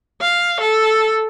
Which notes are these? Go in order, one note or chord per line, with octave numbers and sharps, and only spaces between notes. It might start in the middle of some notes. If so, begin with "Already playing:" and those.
F5
A4